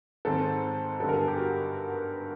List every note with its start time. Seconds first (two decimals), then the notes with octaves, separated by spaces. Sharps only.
0.25 G#2 D#3 G#3 C4 A4
1.00 G2 D3 G3 B3 A4
1.09 A#4
1.14 A4
1.19 G#4
1.28 G4
1.37 F#4